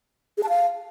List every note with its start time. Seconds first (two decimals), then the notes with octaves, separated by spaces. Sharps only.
0.38 G#4
0.43 A5
0.49 F5